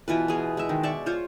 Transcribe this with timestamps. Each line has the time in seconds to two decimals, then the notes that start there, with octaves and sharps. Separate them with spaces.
0.08 B2 E3 F4 B4
0.28 B3 G#4
0.57 G#3 E5
0.69 D#3
0.83 D5 E5 C#6
1.06 F4 C5 C#5